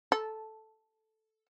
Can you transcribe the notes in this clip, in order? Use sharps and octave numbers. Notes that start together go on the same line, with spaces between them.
A4